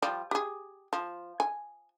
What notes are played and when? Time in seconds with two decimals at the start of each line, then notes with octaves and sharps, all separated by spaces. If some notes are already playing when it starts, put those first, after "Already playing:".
0.02 F3 G3 D5
0.31 G4 G#4
0.93 F3
1.40 G#5